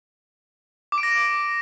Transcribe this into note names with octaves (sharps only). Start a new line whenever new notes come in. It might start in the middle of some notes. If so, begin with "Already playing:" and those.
D6
D7
A#6